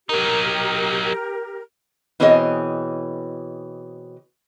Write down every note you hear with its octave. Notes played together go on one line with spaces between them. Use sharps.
F#3 D#4 G4 A#4
B2 E3 C4 G#4 C#5 D#5